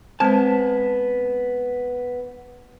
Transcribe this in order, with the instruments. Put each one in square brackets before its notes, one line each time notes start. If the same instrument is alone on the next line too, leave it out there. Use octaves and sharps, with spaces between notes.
[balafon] G#3 C4 C5 [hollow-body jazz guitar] B3 A5